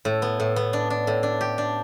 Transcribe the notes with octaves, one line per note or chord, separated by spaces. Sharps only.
A2
B3
A2
B3
D4
D4
A2
D4
G4
D4